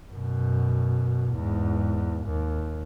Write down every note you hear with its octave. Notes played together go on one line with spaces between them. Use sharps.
F#2 B2
E2 G#2
D#2